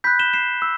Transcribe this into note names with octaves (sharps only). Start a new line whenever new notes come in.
B5 F#6 G6 B6
E7 G7
C7 E7
E6